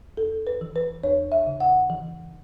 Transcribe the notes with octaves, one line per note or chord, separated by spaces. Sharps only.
E2 A4
B4
E3
B4
E2 C#5
E5
C#3
F#5
E3